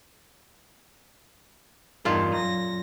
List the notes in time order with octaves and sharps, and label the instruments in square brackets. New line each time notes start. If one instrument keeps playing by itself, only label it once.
[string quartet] E2 G2 D#3 [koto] A#2 F4 A5
[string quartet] F#2 F#3 A#6